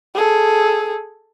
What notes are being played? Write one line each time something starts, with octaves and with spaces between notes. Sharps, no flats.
G#4 A4